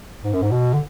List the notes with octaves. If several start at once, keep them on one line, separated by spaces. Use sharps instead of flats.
G#2
F#2
G#2
B2
D3